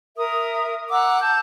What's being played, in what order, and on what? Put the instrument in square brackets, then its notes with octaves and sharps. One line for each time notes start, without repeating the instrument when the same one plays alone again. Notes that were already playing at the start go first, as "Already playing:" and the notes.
[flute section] A#4 E5 D#6
F#5 A#5 D6 E6
A5 G6